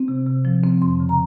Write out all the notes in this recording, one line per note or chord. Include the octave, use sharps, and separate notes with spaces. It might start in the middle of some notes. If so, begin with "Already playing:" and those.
Already playing: C4
C3
C3
F3
C4
F2 C6
C#3
A#5